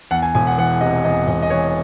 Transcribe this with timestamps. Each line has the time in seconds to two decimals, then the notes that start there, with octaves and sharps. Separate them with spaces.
0.11 E2 F#5
0.22 G#5
0.35 E1 G#5
0.47 F#5
0.58 E3 F#5
0.81 C3 D#5
1.04 E2 D#5
1.28 E1 D#5
1.42 D#5
1.50 E3 C#5